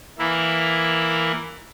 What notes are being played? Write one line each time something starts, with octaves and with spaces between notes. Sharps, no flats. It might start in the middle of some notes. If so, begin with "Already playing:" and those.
E3 A#3 E4